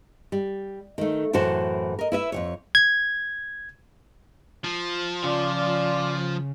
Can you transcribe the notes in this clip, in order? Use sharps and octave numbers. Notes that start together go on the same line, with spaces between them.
G3
D#3 A3
F#2 A2 E3 F#4 C5 A5
A#4 D#5
E4 B4 E5
F2 F#3 C#5
G#6
F3
C#3 F4 D5